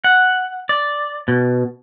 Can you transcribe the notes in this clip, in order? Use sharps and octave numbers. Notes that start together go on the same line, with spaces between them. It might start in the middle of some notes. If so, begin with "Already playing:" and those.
F#5
D5
B2